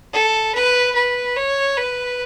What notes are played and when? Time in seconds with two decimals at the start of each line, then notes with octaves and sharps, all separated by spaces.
0.14 A4
0.55 B4
0.95 B4
1.37 C#5
1.77 B4